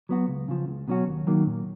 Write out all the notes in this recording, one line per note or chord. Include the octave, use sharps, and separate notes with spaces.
F#3 B3 F#4
C#2
C#3 F3
C#2
B2 F#3 C#4 F#4
D#2
D#3 F#3 A#3
A#2